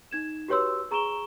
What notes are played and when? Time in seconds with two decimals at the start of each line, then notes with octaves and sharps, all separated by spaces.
0.11 D#4 G#6 E7
0.48 F#4 G4 B4 C#5 C6 E6
0.91 G#4 A#5 C#6 D7 E7 G7